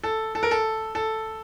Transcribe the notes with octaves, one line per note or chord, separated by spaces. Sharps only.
A4
A4
A#4
A4
A4